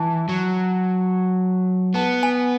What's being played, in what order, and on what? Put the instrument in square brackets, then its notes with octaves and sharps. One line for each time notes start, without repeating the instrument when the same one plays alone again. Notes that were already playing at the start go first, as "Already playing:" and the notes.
Already playing: [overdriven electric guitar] E3 [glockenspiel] A5
[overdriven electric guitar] F#3
[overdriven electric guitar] B3 [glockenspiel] A5
[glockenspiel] G#5